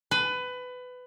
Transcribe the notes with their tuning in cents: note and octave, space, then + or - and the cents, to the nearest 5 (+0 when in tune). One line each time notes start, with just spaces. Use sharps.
B4 +20